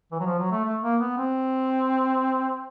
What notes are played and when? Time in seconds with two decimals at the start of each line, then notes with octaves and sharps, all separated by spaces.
0.12 E3
0.20 F#3
0.26 F3
0.39 F#3
0.51 A3
0.64 A3
0.83 A#3
1.01 B3
1.18 C4